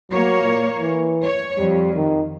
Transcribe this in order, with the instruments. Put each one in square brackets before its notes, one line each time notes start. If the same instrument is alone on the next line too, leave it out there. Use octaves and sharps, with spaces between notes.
[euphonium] F#3 [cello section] A#3 C#5
[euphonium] A#2
E3
[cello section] C#5
[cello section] F2 [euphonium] G3
[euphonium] D#3